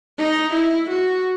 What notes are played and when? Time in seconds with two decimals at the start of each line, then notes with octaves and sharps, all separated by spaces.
0.18 D#4
0.54 E4
0.90 F#4